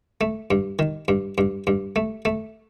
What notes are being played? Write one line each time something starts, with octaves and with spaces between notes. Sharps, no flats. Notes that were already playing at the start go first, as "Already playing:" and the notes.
A3
G2
D#3
G2
G2
G2
A3
A3